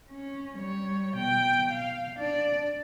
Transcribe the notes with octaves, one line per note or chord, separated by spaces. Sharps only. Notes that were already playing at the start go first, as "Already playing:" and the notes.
C#4
G3 C#5
B2 G5
F5
D4 D5